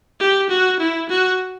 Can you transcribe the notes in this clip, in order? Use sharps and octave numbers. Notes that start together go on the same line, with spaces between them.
G4
F#4
E4
F#4